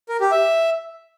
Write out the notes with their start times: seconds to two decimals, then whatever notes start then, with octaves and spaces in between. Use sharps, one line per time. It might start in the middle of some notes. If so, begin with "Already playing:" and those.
0.09 A#4
0.20 G4
0.32 E5